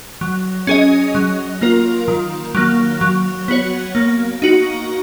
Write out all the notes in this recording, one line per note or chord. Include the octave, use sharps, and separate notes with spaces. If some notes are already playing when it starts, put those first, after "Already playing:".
F#3
C#4 G#4 D#5
F#3
A#3 F4 A#4
D#3
F#3 A#3
F#3
B3 F#4 C#5
A#3
D#4 F#4